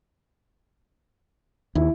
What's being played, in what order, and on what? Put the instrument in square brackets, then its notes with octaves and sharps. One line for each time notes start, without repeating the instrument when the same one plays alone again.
[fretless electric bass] D#2 [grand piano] E4